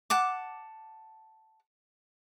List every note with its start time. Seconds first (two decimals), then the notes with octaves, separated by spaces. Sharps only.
0.10 F#5 A5 D6